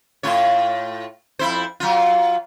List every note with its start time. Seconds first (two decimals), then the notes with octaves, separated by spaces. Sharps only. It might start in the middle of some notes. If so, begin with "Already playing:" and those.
0.23 A2 F4 C#5
1.39 F2 E4 C5
1.80 F#3 F4